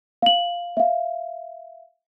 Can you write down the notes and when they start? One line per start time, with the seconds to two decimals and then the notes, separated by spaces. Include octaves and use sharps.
0.22 F5 F#7
0.77 E5 F5